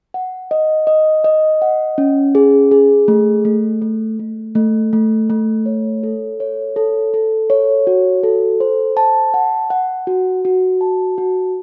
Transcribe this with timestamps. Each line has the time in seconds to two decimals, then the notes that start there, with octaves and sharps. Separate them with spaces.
0.14 F#5
0.51 D#5
0.87 D#5
1.24 D#5
1.62 F#5
1.98 C#4
2.35 G#4
2.71 G#4
3.08 A3
3.45 A3
3.82 A3
4.19 A3
4.55 A3
4.93 A3
5.30 A3
5.66 C#5
6.03 A4
6.40 C#5
6.76 A4
7.14 A4
7.50 C#5
7.87 F#4
8.23 A4
8.60 C5
8.97 A5
9.34 F#5
9.70 F#5
10.07 F#4
10.45 F#4
10.81 A5
11.18 F#4